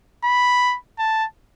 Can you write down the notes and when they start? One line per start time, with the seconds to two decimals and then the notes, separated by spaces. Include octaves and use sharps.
0.24 B5
0.99 A5